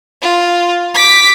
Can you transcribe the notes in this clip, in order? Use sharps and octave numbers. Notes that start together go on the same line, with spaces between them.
F4
D6 B6